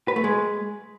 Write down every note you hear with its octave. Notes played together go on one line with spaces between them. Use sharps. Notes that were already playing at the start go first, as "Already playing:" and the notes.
B4
A3
G#3